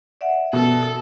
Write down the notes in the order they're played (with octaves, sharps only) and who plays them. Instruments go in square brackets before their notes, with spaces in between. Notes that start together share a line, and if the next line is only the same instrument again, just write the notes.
[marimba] D5 E5 F#5
[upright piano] B2 [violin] A4